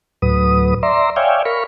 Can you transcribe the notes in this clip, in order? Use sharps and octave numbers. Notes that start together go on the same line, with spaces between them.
D2 A2 F#3 B4 D#6
D5 E5 A#5 C6
C#5 D5 E5 F5 G5 G#5
A#4 F5 B5 C#6